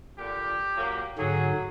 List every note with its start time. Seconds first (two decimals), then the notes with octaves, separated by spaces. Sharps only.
0.18 A#2 D3 G4
0.76 A#2 F#3 A#3
1.18 G#2 D3 F#3 G#4